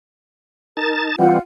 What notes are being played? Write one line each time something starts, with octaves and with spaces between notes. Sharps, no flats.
D#4 A#4 A5 A6
E3 G3 C4 F4 F#5